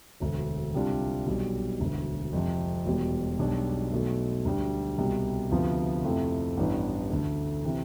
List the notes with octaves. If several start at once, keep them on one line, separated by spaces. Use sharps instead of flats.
E1 D2 D3
C2 C3 G3 D4 F4
B1 B2 G3
E1 D2 D3
F2 C3 F3
E1 E2 B2 G3
B1 B2 G3 D4
B1 B2 A3
D2 D3 G3
C2 B2 G3
D2 C3 F3 B3 F4
F2 C3 F3 A3 E4
A1 G2 E3 B3 D4
D2 D3 A3
C3 E3